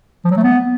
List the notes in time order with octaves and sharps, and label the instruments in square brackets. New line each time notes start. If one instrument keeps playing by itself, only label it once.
[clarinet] F3
F#3
A3
B3